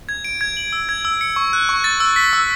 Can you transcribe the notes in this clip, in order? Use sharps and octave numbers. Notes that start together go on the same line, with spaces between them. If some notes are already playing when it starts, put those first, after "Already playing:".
G#6
D7
G#6
F#7
E6
G#6
E6
C#7
C#6
F#6
C#6
A6
E6
B6
E6